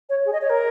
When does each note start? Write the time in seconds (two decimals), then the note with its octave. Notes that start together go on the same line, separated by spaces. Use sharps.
0.09 C#5
0.25 G#4
0.33 D#5
0.41 C#5
0.50 A#4